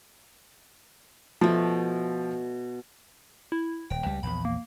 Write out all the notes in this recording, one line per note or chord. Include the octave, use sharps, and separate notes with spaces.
B2 F3 A3
E4
D#1 G5
C#2 G3
A#1 E2 B5
A#3